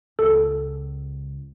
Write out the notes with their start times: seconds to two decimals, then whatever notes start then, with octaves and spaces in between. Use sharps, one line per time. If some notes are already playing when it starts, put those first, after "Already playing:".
0.19 C#2 A4